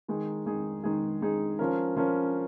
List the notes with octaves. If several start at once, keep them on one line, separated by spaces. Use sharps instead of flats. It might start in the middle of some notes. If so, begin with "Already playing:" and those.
D#3 G#3 D#4 G#4
D#3 G#3 D#4 G#4
D#3 G#3 D#4 G#4
D#3 G#3 D#4 G#4
F3 C#4 A#4
F3 C#4 A#4